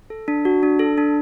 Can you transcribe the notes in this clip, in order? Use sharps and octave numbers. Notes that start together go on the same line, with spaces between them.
A4
D4
F#4
D4
A4
D4